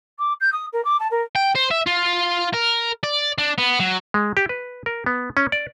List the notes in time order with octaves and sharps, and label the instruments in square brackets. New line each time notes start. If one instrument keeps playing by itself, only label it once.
[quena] D6
G6
D#6
A#4
D6
A5
A#4
[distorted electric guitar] G5
C5
E5
F4
A#4
D5
D4
B3
F#3
[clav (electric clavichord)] G#3
G4
B4
A#4
B3
C#4
D5